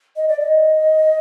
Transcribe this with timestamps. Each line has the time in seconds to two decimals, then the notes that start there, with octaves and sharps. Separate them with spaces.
0.16 D#5
0.28 D5
0.40 D#5